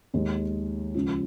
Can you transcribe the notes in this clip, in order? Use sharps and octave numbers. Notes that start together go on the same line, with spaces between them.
D#2 D#3 G#3
C#2 C#3 F3